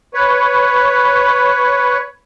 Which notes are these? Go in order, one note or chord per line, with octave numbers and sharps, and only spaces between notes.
B4 C#5